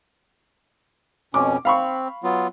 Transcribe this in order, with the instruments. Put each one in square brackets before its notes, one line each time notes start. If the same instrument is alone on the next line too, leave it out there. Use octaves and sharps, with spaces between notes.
[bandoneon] F2 B2 C#4 [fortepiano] D6
[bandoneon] C4 [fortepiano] F5 B5 C#6
[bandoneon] F#3 B3 F4